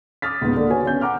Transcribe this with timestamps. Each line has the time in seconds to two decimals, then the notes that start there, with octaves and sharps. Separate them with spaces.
0.22 D6 D#6 F6 A6 B6
0.41 C#2 G#2 B3
0.56 D3 A#3
0.70 F#4 B4 C#5 G#5
0.86 B3 C#4 G6
1.01 F#5 A#5 D6 F6